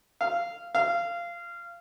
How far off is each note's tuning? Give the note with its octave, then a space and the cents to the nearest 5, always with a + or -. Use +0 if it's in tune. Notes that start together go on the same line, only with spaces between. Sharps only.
F5 -15
F5 -20